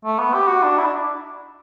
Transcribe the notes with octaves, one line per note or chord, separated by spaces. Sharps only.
A3
B3
G4
F#4
D4
E4
D4